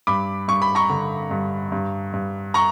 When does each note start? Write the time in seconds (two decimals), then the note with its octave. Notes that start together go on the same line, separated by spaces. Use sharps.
0.07 G2 B5 D6
0.48 G2 C#6
0.62 B5
0.75 A#5 C#6
0.89 D3
1.31 G2
1.72 G2
2.13 G2
2.54 A#5 C#6